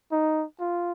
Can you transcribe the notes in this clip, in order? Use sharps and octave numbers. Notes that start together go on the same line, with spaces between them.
D#4
F4